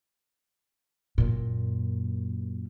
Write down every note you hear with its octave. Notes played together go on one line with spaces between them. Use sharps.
F#2 A#2